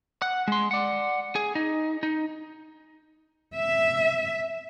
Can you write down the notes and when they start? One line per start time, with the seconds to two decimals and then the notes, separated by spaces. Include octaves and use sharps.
0.22 F#5
0.48 G#3 C6
0.71 D5 F#5
1.35 G#4
1.55 D#4
2.03 D#4
3.55 E5